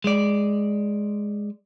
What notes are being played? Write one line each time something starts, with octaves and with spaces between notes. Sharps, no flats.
G#3 D5